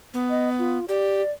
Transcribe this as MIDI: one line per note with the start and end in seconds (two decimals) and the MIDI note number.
0.14 0.78 59
0.30 0.49 75
0.59 0.86 65
0.89 1.22 67
0.89 1.32 74